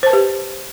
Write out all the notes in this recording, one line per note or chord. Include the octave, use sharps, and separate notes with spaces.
G4 B4 C5 A5